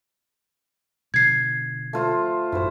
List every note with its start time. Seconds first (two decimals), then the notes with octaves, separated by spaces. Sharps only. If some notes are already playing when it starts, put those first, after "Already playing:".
1.14 B2 D3 F3 G#6 C7
1.93 A3 F4 C5
2.52 A1 F#2 E4 F#4 C5